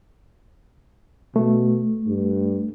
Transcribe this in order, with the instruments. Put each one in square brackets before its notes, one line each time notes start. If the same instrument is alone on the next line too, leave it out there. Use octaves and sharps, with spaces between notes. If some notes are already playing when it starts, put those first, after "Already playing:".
[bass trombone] B2 [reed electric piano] A3
[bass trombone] G2